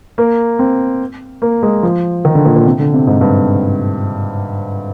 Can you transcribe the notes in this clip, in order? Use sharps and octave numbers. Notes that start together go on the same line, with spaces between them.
A#3
C4
A#3
G#3
F3
D#3
D3
A#2
A#2
C3
D3
C3
G#2
G2